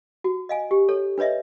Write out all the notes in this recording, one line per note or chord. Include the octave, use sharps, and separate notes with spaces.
F#4
D#5 F5 G#5
G4
A4 C#5
D4 B4 C#5 D#5 E5